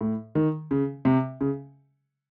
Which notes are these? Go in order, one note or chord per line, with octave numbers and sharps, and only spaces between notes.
A2
D#3
C#3
C3
C#3